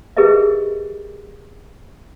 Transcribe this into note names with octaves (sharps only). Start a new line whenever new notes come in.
G4 G#4 A#4 B4 D#5 E5